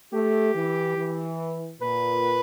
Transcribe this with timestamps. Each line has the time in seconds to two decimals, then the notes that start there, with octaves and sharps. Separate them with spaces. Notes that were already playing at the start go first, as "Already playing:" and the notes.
0.13 A3 G4
0.55 E3
0.97 E3
1.81 A#2 B4